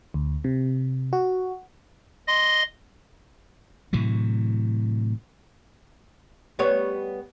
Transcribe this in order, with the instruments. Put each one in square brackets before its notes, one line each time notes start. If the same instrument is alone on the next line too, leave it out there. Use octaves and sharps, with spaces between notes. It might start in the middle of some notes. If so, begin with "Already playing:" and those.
[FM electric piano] D2
C3
F#4
[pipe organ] D#5 C6
[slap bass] A2 C3 E3 F#3
[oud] G3 B3 C#5